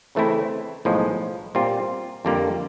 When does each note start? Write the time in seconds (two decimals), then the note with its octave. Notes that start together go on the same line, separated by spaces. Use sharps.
0.15 C#3 E3 A3 C4 E4
0.85 B1 A2 F3 G#3
1.55 A#2 G3 C4 F4
2.25 F2 D3 G3 A#3